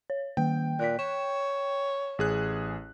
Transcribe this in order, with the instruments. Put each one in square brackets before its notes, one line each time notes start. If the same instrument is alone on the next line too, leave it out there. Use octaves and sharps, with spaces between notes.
[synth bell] C#5
[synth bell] D#3 A#3 [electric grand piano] G5
[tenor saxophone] A#2 [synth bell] F#6 B6
[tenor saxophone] C#5 [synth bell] E7
[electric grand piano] A1 G#4 F#6